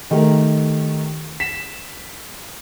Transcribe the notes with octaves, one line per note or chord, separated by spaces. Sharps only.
D#3 A3 G4 A#4
B6 E7